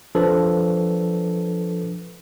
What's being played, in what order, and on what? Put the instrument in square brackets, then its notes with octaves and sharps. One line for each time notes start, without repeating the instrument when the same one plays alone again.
[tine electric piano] F3 D4 A4 B4